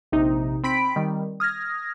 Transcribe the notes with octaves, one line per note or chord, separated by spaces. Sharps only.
A#1 C3 D#4
C4 B5 B6 D7
D#3 G3
D#6 F6 G#6 A#6